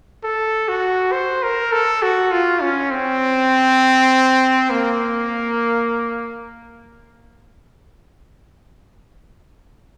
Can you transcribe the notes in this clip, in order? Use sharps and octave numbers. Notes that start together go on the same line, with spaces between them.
A4
F#4
C5
A#4
A4
F#4
F4
C#4
C4
A#3